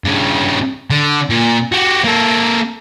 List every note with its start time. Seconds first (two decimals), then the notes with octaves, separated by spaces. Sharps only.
0.05 G2 C#3
0.90 D3
1.30 A#2
1.72 F#4 G4
2.04 A#3 A4